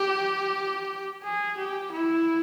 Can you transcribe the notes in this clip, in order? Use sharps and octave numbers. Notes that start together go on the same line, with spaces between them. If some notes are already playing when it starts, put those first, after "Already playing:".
Already playing: G4
G#4
G4
E4